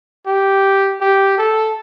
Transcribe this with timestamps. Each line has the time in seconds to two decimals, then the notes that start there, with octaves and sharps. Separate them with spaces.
0.26 G4
1.01 G4
1.38 A4